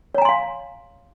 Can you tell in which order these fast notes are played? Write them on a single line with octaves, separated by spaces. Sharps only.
C#5 A#5 G#5 C6 F5